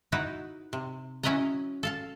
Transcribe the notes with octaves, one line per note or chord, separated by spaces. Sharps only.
D#4 E4 F#4 B4 F#5
C3
F#3 C#4 E4 B4 D#5 A#5
A4 F5 A5